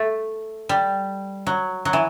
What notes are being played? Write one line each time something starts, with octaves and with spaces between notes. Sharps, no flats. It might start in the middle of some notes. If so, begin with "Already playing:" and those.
Already playing: A3
G3
F#3
F#3
E3